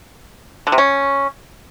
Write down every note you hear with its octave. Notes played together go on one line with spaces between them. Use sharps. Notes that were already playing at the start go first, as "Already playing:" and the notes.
D3
C3
C#4